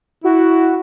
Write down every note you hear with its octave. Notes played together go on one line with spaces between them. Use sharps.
E4 F#4